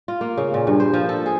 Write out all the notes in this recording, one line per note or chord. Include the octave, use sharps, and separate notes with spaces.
F4
A#3
C#3
A#2
G2
C5
F3
A4
G#4